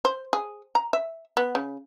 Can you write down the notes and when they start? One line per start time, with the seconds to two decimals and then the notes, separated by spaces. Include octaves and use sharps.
0.05 C5
0.33 G#4
0.75 A#5
0.93 E5
1.37 B3
1.55 C#3